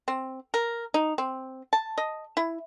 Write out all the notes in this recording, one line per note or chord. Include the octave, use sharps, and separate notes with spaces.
C4
A#4
D#4
C4
A5
D#5
E4